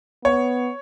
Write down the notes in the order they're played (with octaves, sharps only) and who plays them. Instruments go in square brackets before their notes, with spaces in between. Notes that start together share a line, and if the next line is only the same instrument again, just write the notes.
[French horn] B3 [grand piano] C#5